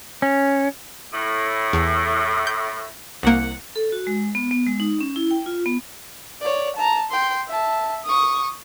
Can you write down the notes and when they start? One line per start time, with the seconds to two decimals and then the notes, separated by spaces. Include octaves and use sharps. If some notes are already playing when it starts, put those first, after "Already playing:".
0.22 C#4
1.12 A2
1.73 E2
2.47 G6
3.23 C2 A#3 F#5
3.76 A4
3.92 F#4
4.07 G#3
4.35 B3
4.51 B3
4.66 G#3
4.80 D#4
5.01 C#4
5.16 E4
5.31 G5
5.46 F4
5.66 B3
6.41 C#5 D5
6.76 A5 A#5
7.11 G5 C6
7.48 E5 A5
8.05 C#6 D#6